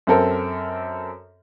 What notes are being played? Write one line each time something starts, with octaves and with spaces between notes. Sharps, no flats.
F#2 C4 A4 A#4